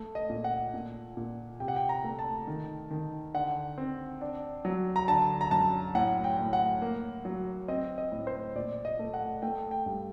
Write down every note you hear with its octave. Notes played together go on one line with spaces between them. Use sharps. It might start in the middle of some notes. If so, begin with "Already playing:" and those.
Already playing: A3
D#5
A#2
F#5
A#2
A#2
C3 G5
F#5
G5
A#5
A3
A5
D#3
D#3
D3 F#5
C4
D4
F#3
A#5
D3 A5
A#5
F#2 A5
A2 F#5
G5
A2
F#5
A#3
F#3
C4 D#5
D#5
A2
C5
A#2 D5
D#5
A3
F#5
A3 G5
G5
G2